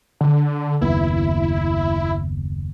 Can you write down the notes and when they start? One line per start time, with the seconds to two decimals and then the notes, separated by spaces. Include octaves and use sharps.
0.21 D3
0.81 F#1 D#2 B3 E4